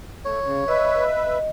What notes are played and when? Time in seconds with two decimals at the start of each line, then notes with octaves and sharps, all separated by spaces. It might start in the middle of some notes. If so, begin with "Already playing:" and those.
0.25 A3 C#5
0.44 C#3
0.68 B4 D#5 E5